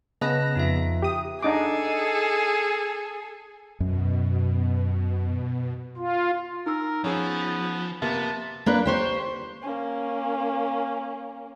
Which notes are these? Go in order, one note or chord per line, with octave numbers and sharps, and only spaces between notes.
C#3 B3 D#5 A5 F#6 A#6
F2 D#4 F4 E5
G4 D#6
D4 D#4 G#4 A4 D6
F#2 B2
F4
D#4 A#4 E6
F3 B3 C#4 G#4
C3 A#3 B3 A5
A#3 D4 B4 D5
G4 C5 C#5
A#3 C#4